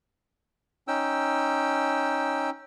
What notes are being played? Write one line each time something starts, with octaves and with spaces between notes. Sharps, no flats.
C#4 D#4 G5 E6